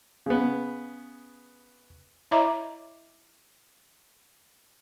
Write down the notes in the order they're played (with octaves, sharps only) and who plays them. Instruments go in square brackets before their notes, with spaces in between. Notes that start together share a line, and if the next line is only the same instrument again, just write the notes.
[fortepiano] C#3 B3
[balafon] E4 C#5 D#5 E5 A#5 D6